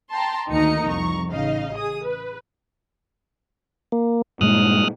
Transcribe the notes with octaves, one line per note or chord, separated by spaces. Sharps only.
G5 A5 A#5 C6
D2 D#3 A#3 D#4 A#5 C#7
C2 F2 A#5 C#6
A1 C#3 D#4 D#5 F5
G#4 D#6
B4
A#3
G2 A#2 G#3 D#6 F6 F#6